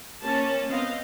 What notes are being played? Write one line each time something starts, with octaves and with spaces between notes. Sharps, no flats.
A#3 C#4 A5
B3 C4 D#5 F5